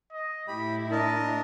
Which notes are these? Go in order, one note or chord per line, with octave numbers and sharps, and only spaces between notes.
D#5
A2 E4 G4 B5
D4 A#4 D#5 A5